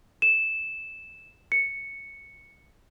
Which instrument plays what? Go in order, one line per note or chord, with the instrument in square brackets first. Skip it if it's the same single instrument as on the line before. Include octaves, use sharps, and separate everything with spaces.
[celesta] E7
C#7